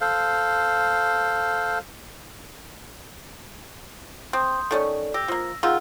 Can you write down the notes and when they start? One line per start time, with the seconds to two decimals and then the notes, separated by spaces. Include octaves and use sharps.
0.01 A4 C5 F5
4.33 C4 C6 D#6 G6
4.71 D#3 A3 C#4 A4 D5
5.14 G4 E6 A#6
5.28 F3 A#3
5.63 D#3 F4 G#4 F#5 E6